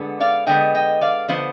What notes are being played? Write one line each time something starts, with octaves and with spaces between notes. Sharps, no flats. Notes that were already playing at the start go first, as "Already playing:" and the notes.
Already playing: D3 G#3 B3
D5 F5
D3 G#3 B3 D#5 G5
D#5 G5
D5 F5
D3 F3 B3 C5 D#5